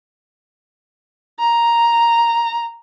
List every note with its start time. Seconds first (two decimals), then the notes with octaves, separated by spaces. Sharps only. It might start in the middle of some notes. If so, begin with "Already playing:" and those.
1.40 A#5